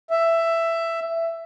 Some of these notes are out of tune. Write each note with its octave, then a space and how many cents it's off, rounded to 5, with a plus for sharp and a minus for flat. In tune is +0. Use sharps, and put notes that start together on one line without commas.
E5 +10